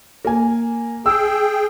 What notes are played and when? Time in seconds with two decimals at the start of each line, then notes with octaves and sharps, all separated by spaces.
0.25 A#3 G#5
1.06 G#4 G5 E6